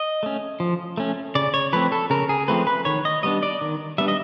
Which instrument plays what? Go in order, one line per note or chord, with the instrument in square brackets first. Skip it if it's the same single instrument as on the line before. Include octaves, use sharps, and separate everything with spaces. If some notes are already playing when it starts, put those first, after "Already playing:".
Already playing: [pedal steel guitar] D#5
A3 C#4
F3
A3 C#4
C#3 D5
C#5
F3 A3 C4 B4
A4
C#3 A#4
G#4
F3 A3 C4 B4
B4
D#3 C#5
D#5
G3 B3 D4 D#5
D5
D#3
G3 B3 D4 E5
D#5